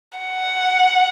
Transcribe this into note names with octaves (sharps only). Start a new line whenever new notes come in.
F#5